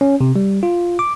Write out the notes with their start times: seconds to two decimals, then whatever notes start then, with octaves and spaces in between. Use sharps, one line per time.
0.01 C#4
0.21 C3
0.36 G3
0.63 F4
0.99 D6